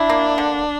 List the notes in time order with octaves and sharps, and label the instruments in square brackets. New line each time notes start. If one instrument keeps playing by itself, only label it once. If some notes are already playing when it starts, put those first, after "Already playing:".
Already playing: [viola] D4 [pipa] E4
[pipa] A#3
D3